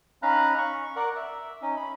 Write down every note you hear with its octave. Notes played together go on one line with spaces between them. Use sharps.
C#4 D#4 F5 A#5 B5 F#6
C#6
A#4 D5 F#5
E5
C#4 D#4
B5